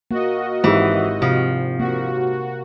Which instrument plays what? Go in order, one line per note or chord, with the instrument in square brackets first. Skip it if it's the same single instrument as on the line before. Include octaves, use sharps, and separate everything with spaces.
[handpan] A#3 [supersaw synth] F#4 D#5
[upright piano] G#1 G4 [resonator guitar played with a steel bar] E3
[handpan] C3 [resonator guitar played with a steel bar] F3
[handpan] A#3 [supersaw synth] F#4